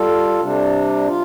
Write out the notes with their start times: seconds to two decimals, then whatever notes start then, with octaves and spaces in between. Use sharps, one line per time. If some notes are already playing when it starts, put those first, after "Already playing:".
Already playing: G3 F4 A4
0.41 C3 G3 D4
1.08 F4